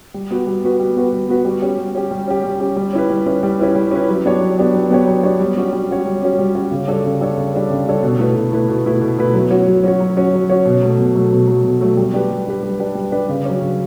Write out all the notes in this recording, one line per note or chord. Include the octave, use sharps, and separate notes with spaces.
G3
B3 F#4 B4
G3
B3 F#4 B4
G3
B3 F#4 B4
G3
B3 F#4 B4
G3
C#4 G4
G3
C#4 G4
G3
C#4 G4
G3
C#4 G4
G3
C#4 E4 B4
G3
C#4 E4 B4
G3
C#4 E4 B4
G3
C#4 E4 B4
F#3
B3 D4 G4 C#5
F#3
B3 D4 G4 C#5
F#3
B3 D4 G4 C#5
F#3
B3 D4 G4 C#5
G3
C#4 F#4 C#5
G3
C#4 F#4 C#5
G3
C#4 F#4 C#5
G3
C#4 F#4 C#5
C#3
G3 D4 A4 C#5
C#3
G3 D4 A4 C#5
C#3
G3 D4 A4 C#5
C#3
G3 D4 A4 C#5
B2
A3 E4 B4
B2
A3 E4 B4
B2
A3 E4 B4
B2
A3 E4 B4
F#3
C#4 F#4 C#5
F#3
C#4 F#4 C#5
F#3
C#4 F#4 C#5
F#3
C#4 F#4 C#5
B2
F#3 A3
B2
F#3 A3
B2
F#3 A3
B2
F#3 A3
G3
D4 G4 B4
G3
D4 G4 B4
G3
D4 G4 B4
G3
D4 G4 B4
C#3
F#3 C#4
C#3